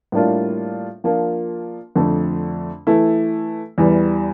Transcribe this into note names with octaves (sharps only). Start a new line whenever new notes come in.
A2 G3 A#3 D4 F4
F3 A#3 D4 F4
F2 D3 A3
E3 A3 E4
E2 E3 G3